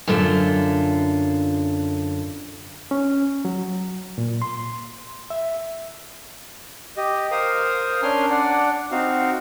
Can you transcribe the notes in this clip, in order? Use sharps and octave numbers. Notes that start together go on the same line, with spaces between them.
F#2 D3 E4 F4 E5
C#4
F#3
A#2
C6
E5
G4 D#5
A#4 C5 F5 D#6
C#4 D4 A#4 G#5 C6 F6
D4 D5 F#5
C4 D#4 F#4 F5